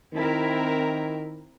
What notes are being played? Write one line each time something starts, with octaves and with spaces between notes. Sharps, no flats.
D#3 C4 E4 A#4